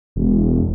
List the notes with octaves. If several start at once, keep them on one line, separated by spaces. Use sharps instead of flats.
E1